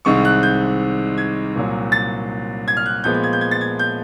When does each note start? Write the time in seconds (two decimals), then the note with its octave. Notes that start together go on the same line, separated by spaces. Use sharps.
0.05 C2 C3 D#3 G#3 C#6
0.25 F#6
0.43 G6
1.18 G#6
1.55 C2 A#2 F#3
1.92 A6
2.68 G#6
2.77 F6
2.86 F#6
3.04 A#2 F3 G#3 B3 G6
3.14 G6
3.23 G#6
3.33 G6
3.41 G#6
3.51 A6
3.61 G#6
3.79 G6